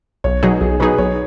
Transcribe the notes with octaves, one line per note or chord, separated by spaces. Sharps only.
B1 C#5
B2 F#3 D#4 G#4
B1 G#4
B2 F#3 D#4 G#4 B4
B1 C#5